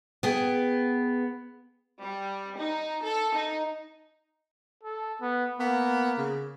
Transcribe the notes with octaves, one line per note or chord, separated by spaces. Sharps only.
B3 G#4 G5
G3
D#4
A4
D#4
A4
B3
A#3 B3
C#3